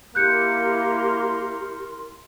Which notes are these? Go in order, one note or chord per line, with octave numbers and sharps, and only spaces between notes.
A#3 E4 G4 A#4 C6 F#6 G6 C#7